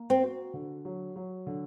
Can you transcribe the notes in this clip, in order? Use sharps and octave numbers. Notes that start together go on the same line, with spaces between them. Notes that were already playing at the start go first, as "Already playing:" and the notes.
Already playing: A#3
C4
F#4
D3
F#3
F#3
D3